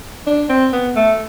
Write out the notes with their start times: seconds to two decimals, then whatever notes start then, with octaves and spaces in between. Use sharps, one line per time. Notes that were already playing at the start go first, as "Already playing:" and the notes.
0.27 D4
0.50 C4
0.73 B3
0.95 A3